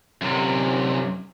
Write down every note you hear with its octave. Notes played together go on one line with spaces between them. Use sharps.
F#2 C3